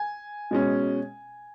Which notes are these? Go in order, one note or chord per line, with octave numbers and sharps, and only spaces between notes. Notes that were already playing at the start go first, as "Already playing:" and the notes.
Already playing: G#5
B2 G#3 C#4